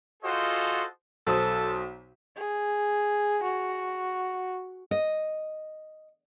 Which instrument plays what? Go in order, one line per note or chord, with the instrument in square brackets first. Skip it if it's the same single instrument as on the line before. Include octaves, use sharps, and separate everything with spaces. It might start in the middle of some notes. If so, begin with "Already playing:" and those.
[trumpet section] F4 F#4 G#4 A4 C5 D#5
[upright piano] B1 C5 D#6 [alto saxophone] A4
[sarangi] G#4
F#4
[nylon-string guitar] D#5